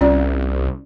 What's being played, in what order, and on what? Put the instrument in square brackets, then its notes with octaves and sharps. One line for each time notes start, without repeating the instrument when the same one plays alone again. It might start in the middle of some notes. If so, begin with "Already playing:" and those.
[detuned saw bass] C2 [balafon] C#4 F4 D5